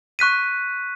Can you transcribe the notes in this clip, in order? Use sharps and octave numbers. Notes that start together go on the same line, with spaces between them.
C#6 F#6 B6 D#7